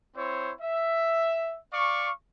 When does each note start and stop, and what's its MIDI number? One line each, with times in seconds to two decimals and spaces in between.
0.16 0.53 60
0.16 0.53 64
0.16 0.53 72
0.16 0.53 73
0.61 1.58 76
1.73 2.11 74
1.73 2.11 77
1.73 2.11 85